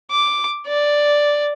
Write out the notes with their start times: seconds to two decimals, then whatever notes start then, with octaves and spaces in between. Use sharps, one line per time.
0.11 D6
0.67 D5